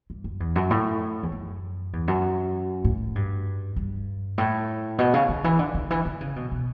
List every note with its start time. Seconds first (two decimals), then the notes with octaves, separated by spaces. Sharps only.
0.10 G2
0.24 F#2
0.40 E2
0.56 F#2
0.71 A2
1.23 E2
1.32 F#2
1.93 E2
2.08 F#2
2.84 A2
3.15 G2
3.76 G2
4.38 A2
4.98 B2
5.14 C#3
5.29 D3
5.44 E3
5.59 D3
5.75 D3
5.91 E3
6.06 D3
6.21 C#3
6.36 B2
6.52 B2